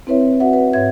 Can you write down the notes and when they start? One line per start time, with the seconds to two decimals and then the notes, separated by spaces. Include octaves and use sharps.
0.07 C4 E4 B4 C#5 E5
0.40 F#4 B4 E5 F#5
0.53 B4
0.73 G#2 C#5 E5 G#6